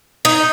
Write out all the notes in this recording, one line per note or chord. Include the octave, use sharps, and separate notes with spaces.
D#4